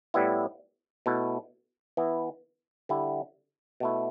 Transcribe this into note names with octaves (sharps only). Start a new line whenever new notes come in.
A2 G3 B3 E4
B2 A3 E4
E3 B3 E4
D3 G3 E4
B2 A3 E4